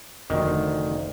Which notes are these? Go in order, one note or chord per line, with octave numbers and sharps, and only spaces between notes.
F1 D2 D#3